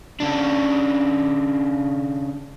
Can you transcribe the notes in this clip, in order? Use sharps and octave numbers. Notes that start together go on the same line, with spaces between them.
C#3 D4